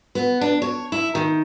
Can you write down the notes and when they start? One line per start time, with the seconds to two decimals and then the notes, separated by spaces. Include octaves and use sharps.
0.15 B3
0.41 D4
0.62 C#5
0.92 E4
1.15 D#3